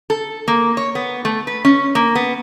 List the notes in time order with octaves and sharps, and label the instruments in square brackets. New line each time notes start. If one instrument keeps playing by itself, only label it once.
[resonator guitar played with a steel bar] A4
A#3
C#5
B3
A3
B4
C#4
A#3
B3